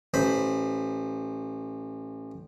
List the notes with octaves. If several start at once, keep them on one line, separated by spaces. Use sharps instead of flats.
A1 C5 B5